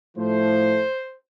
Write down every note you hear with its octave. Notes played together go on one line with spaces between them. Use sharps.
A2 F3 A3 C5